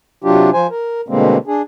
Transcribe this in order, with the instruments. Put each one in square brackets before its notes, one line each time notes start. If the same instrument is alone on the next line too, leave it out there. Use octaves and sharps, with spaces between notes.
[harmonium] C3 F#3 D4 F4 G4
F3 C5 G#5
A#4
B2 D3 G3 G#3 A#3 C4
D4 G#4